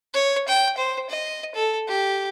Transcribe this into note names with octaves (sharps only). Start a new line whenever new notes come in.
C#5
G5
C5
D#5
A4
G4